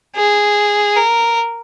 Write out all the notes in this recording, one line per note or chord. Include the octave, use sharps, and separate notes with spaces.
G#4
A#4